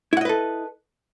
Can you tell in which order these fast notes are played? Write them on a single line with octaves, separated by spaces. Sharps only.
E4 F#5 D#5 B4 A4